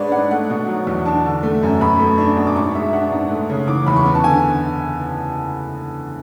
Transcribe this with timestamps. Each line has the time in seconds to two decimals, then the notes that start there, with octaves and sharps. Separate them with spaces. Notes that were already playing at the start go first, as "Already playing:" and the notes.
Already playing: G#2 G#3 D4 B4 C#5 D5
0.12 G#2 F#5
0.31 A3 F#5
0.50 B2
0.68 F#3
0.87 E2
1.05 D4 A5
1.25 D3
1.43 A3
1.63 F#2
1.81 B2 B5
2.00 A3
2.18 D4
2.37 B2
2.47 D6
2.56 G#2 C#6
2.75 G#3 E5
2.93 D4 F#5
3.12 G#2
3.31 A3
3.50 C#3
3.68 E3 D6
3.86 E2 B5
3.96 C#6
4.06 B3
4.15 A5
4.24 D3 G#5